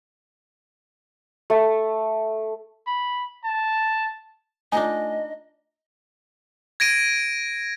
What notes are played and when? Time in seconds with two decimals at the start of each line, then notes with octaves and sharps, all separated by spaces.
1.50 A3
2.87 B5
3.44 A5
4.72 A3 D4 D#4 F4 D#5 G#5
6.80 G#6 A#6 D7 D#7